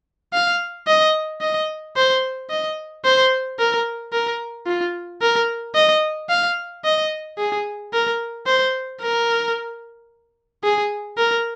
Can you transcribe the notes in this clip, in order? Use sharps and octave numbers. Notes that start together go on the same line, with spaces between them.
F5
D#5
D#5
C5
D#5
C5
A#4
A#4
F4
A#4
D#5
F5
D#5
G#4
A#4
C5
A#4
G#4
A#4